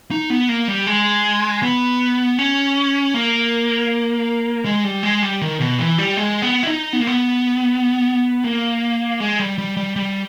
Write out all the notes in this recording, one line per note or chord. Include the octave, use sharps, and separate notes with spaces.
D#4
B3
A#3
G3
G#3
B3
C#4
A#3
G#3
G3
G#3
G3
D#3
B2
E3
G3
G#3
B3
E4
D#4
B3
A#3
B3
A#3
G#3
G3
G3
G3
G3